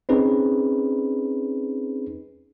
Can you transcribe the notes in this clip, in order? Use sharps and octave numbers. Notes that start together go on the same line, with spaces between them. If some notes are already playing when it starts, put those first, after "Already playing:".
C4 C#4 D#4 G#4 B4